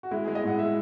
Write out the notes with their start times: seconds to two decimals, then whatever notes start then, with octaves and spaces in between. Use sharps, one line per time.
0.03 F#4
0.11 G#3 E4
0.24 G#3 G#4
0.35 D#5
0.44 A2 F#5
0.59 G#3 E5